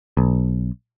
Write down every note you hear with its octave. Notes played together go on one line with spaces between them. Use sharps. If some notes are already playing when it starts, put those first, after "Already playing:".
B1